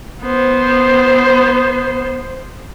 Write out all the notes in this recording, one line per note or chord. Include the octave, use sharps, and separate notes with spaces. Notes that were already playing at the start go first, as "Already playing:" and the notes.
B3 C5